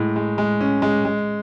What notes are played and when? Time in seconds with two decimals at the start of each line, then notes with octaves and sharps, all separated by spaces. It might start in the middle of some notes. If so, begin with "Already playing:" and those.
Already playing: A2 G#3
0.16 G#3
0.38 G#3
0.61 C#4
0.82 G#3
1.05 G#3